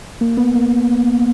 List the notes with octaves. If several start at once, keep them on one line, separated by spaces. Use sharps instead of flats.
A#3
B3
A#3